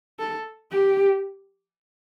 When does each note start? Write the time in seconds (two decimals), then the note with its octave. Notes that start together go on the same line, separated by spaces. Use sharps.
0.19 A4
0.71 G4